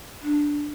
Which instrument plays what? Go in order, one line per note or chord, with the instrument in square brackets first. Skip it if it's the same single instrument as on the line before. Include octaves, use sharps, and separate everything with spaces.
[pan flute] D4